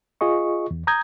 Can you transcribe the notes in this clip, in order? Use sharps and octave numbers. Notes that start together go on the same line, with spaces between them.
F4 G#4 D#5 C#6
E2
A#5 D#6 G6 G#6